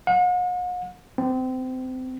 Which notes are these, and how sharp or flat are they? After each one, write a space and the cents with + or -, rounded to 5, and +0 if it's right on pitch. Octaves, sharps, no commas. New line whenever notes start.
F#5 -45
C4 -25